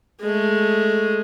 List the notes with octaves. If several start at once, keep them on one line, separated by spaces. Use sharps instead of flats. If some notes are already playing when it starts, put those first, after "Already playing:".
G#3 A3